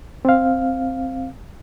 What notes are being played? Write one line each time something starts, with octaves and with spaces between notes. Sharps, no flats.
C4 F5